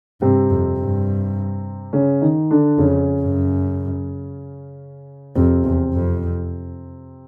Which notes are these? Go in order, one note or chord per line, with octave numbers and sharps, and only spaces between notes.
G2 C3 C4
F2
G2
C#3 C#4
D#3 D#4
D3 D4
F2 C#3 C#4
F#2
F2 C3 C4
E2
F2